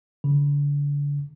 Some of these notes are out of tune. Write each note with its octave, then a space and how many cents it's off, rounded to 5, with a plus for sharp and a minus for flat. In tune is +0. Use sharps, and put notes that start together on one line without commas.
D3 -35